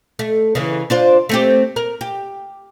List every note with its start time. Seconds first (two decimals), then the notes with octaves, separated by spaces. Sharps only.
0.19 A3
0.55 C#3 E3
0.90 D4 F4 C5
1.29 A3 C4 G4
1.76 A#4
2.01 G4